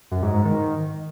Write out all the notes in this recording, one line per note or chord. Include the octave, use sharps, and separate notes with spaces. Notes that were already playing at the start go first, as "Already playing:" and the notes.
F#2
G#2
G#2
D#3